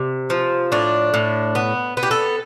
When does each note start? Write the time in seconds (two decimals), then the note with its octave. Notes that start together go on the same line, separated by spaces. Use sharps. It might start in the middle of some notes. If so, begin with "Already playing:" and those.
Already playing: C3
0.30 F3
0.72 A2 D4
1.14 A2
1.55 B3
1.97 B3
2.03 G4
2.11 A4